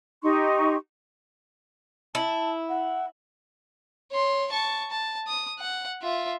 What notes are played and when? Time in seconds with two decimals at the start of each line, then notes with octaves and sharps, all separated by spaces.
0.23 D#4 G4 C6 C#6
2.15 E4 A5
2.69 F#5
4.11 C#5 C6
4.52 A5 C#6
4.91 A5
5.27 D#6
5.59 F#5
6.02 F4 E5